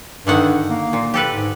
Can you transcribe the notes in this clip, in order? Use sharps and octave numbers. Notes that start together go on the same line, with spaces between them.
G2 D3 D#3 F#5
A#3
A#2
G4 A4 B4
G#2